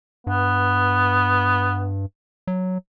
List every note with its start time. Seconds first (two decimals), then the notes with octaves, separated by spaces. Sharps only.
0.27 G2 B3
2.47 F#3